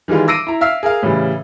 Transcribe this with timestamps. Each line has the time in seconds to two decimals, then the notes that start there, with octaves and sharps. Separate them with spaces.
0.08 D#3 E3 G3 G#3 F4
0.28 D6 E6 A#6 C7 D7 D#7
0.47 E4 A#5
0.61 E5 F5 E6 F6 C7
0.83 G#4 A#4 F5
1.03 A2 C#3 E3 G3